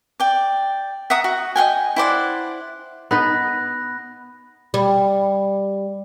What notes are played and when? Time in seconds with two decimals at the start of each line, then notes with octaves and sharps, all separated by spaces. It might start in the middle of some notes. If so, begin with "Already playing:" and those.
0.20 D5 G5
1.10 E5 F#5 A#5 D#6
1.24 F#4
1.56 D#5 F5 G5 G#5
1.96 E4 C5 D5 F#5
3.11 B3 D#4 B4 B5 F#6 A#6
4.74 G3